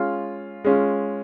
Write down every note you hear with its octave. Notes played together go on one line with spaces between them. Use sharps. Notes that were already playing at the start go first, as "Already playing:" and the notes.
Already playing: G#3 C#4 F4
G#3 C#4 F4